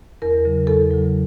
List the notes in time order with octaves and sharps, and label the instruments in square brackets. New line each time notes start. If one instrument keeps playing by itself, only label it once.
[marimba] E2 A#4
C#3 F#3
E2 A4
C#3 F#3